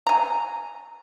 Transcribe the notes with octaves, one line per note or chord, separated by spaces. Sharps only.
G#5 A#5